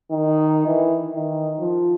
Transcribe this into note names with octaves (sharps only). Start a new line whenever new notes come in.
D#3
E3
D#3
F3